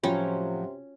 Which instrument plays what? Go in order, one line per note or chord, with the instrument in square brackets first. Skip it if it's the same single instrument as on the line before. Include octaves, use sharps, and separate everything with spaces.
[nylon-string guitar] A2 F3 F#3 [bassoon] C3 [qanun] C#4 [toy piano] F4 F#4 G5